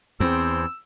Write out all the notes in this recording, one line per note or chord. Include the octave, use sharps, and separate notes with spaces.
E2 C4 E6